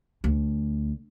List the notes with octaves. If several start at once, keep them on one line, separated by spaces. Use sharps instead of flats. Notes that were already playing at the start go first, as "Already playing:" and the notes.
D2